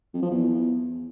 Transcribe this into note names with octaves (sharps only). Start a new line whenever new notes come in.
F2
F3
E2